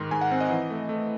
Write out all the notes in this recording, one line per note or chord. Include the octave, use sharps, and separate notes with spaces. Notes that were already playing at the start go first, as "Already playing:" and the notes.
Already playing: G#2 D#3 C6
G#2 G#5
F#5
C4
D#5
E3
A3
A3